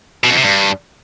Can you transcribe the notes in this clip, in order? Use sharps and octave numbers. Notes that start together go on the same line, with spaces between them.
B2
F2
C3
G2